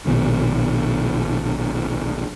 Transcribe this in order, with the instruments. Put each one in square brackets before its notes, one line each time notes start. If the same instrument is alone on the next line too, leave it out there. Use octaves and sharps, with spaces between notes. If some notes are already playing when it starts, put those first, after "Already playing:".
[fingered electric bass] A#1 B2 D#3